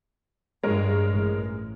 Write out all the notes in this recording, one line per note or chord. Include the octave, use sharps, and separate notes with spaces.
G2 G#3 A#4 C#5
A1